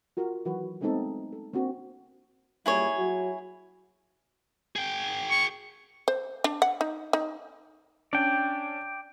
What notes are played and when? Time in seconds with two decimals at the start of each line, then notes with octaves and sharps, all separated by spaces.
0.17 F4 F#4 A#4
0.45 D#3 E3 F#3 F#4 B4
0.81 G#3 A3 B3 C4 D#4 A4
1.33 A4
1.53 A#3 C4 D4 F#4
2.66 F#2 A#2 G3 E4 G#4 C#5
2.96 F#3 F#4
4.76 G#4 G5
5.31 C#6
6.08 C5
6.44 D4
6.62 F#5
6.81 D#4
7.13 D#4
8.13 C#4 D4 D5 G5